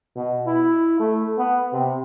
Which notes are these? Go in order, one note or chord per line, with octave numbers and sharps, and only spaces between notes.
B2
E4
A3
B3
C3